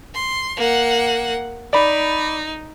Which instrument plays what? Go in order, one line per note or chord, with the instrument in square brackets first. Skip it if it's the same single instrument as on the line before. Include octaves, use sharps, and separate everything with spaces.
[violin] C6
A#3 F#5
[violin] D#4 [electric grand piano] D5 B5